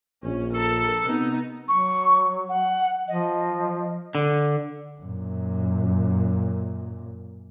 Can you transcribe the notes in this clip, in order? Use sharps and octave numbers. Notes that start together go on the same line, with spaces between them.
A#1 C#4
A4 A#4 A5
C3 B3 D#4
F#3 C#6
F#5
F3 D#5
D3
F#2 A#2